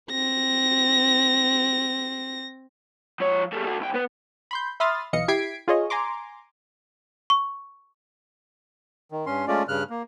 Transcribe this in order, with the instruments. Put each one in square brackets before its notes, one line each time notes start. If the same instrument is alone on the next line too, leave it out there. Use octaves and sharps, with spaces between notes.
[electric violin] C4 A#6
[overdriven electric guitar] F3 C#5
G3 A3
A3 F#4
C2 G5
B3 B4
[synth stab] B5 C6 G6
E5 B5 C6 D#6 F6 A6
B1 E3 D#5 F5 C#7
E4 G4 G#6 B6 C7 D7
F4 G#4 C#5 D#5
G#5 A#5 C6 D6
[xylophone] C#6
[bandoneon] D#3
G2 C#4 C6
G#3 A3 C#4 F4 D5
G2 C#3 F6 F#6
A#3